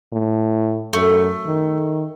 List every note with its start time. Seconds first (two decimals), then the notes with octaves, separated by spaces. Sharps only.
0.13 A2
0.93 F#2 A3
1.47 D#3